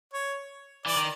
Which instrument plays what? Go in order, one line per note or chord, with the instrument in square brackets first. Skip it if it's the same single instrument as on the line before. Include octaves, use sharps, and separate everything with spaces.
[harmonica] C#5
[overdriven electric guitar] E3 [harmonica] D5
[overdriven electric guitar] D#3